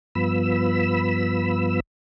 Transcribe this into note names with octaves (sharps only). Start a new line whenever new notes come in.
G2 F3 B3 B5 E6